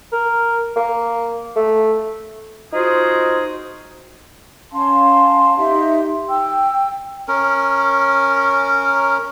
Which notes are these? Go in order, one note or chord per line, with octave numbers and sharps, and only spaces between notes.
A#4
A#3
A3
D#4 F4 F#4 G#4 A#4 C5
C#4 F5 A5 C6
D#4 G4 E5 C6
G5 E6
C#4 A#4